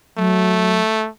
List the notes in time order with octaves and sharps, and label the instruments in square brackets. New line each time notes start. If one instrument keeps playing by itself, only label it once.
[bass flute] F#3 [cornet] A3